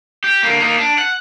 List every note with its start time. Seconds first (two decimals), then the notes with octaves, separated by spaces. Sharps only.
0.24 G4
0.43 D3 A#3
0.60 A#3 D#4
0.78 D4
0.98 F#5